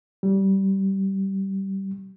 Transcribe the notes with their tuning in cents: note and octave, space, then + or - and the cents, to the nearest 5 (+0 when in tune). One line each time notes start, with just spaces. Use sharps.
G3 -20